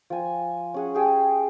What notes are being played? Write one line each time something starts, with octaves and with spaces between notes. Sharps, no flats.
F3 G#5
C#4 G#4 F#5
G4 G#4 G5